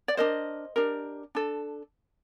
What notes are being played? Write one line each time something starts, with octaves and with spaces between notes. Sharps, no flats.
D5
D4 G4 A#4 C5 D#5
D4 G4 A#4
D4 A4